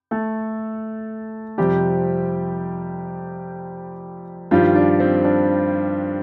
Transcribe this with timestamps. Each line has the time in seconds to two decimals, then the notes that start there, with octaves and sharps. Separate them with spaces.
0.11 A3 A4
1.58 F2 C3 F3 G3 G4
4.51 G2 D#3 F3 G3 F4
4.75 D4
5.00 C4
5.25 D4